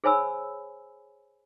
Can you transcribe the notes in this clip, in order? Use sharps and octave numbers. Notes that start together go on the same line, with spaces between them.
G#4 C5 C#5 G#5 B5 E6